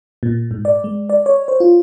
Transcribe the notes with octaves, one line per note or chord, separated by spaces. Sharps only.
A#2
G#2
D5
G#3
D5
C#5
C5
F4